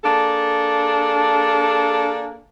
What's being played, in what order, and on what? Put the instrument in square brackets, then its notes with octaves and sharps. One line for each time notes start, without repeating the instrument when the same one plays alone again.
[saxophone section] A#3 D4 G#4 A4